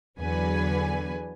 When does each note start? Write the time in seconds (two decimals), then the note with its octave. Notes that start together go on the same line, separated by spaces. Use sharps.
0.19 E2 D3 F#3 B4 G#5